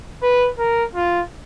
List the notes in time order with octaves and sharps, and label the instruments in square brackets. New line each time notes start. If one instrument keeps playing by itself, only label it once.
[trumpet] B4
A#4
F4